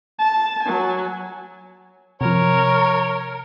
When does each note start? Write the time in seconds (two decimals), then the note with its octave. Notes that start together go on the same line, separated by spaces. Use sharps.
0.19 A5
0.63 F#3 G#5
2.21 C3 F3 A#4 C#5